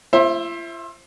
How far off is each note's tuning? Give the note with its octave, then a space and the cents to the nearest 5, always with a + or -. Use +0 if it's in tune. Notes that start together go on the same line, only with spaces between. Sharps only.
F4 -45 C5 +30 E5 +0